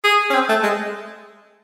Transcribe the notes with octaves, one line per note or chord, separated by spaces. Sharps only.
G#4
C#4
C4
A3
G#3